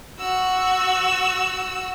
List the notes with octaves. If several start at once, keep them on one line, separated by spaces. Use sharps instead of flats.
F#4 E6